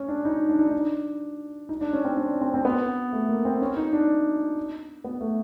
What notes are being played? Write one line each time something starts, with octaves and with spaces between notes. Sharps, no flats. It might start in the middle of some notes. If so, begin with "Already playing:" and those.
Already playing: C#4
D4
D#4
D4
D#4
D4
D#4
D4
C#4
C4
D4
C4
C4
B3
A3
A#3
C4
C#4
D#4
D4
B3
A3